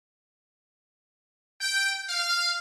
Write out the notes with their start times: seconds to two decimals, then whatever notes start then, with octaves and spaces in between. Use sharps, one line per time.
1.60 G5
2.07 F5